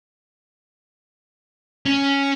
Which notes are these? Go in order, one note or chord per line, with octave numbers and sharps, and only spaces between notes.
C#4